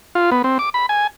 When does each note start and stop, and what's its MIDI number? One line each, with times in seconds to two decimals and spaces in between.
0.15 0.30 65
0.32 0.42 59
0.44 0.58 60
0.59 0.70 86
0.74 0.86 83
0.89 1.07 80